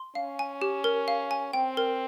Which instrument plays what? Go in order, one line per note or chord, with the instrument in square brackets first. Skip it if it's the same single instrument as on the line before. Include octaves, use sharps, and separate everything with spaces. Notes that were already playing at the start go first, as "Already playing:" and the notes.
Already playing: [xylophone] C6
[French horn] C#4 [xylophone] F5
[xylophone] G#5
G4
A#4
F5
G#5
[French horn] C4 [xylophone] G5
[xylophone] A#4